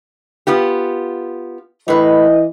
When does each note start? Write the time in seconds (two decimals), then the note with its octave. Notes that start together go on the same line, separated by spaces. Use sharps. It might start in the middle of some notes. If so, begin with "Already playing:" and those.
0.47 B3 F4 G4
1.88 A2 E3 B4 D#5